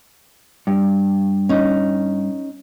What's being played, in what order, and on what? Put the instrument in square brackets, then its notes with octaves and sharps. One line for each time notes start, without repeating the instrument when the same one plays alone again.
[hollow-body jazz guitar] G2
[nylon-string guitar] C#4 D#4